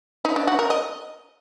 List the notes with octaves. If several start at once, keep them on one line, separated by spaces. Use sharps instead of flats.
D#4
D4
F#4
A#4
D#5